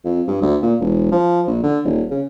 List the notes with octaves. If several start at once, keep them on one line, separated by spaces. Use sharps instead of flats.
F2
G2
D2
A#2
E1
F3
A#1
D3
D#1
C#3